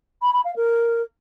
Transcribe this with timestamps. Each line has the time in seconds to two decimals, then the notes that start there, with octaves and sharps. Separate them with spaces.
0.22 B5
0.33 B5
0.44 F5
0.56 A#4